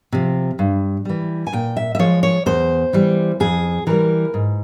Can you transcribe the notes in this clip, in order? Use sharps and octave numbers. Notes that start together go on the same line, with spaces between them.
C3 F3
G2
E3 G3
G#5
A#2 G5
E5
E5
F3 G#3 C#5
C#5
E2 C5
E3 G3
F2 G#4
E3 G3 A#4
G#2